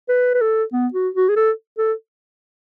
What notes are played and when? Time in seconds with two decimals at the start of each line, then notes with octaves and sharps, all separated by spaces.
0.09 B4
0.34 B4
0.41 A4
0.72 B3
0.94 F#4
1.14 F#4
1.29 G#4
1.36 A4
1.78 A4